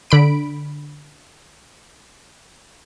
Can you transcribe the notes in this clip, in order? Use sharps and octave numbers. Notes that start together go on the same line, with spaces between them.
D3 B5 D7